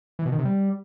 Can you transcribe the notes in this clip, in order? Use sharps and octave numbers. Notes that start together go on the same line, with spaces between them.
E3
B2
D#3
C3
G3